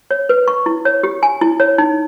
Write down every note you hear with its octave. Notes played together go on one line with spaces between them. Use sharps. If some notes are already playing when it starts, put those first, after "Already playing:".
C#5
B4
C#6
E4
C#5
G4
G#5
E4
C#5
D#4